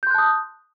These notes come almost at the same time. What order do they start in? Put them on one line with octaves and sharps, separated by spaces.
G6 C6 F#6 A5 D#6